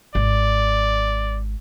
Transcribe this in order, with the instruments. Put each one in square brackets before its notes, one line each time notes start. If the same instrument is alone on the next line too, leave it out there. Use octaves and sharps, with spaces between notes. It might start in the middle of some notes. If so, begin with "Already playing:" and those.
[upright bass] G#1 [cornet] D5